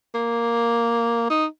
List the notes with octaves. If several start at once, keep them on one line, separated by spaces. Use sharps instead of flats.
A#3
D#4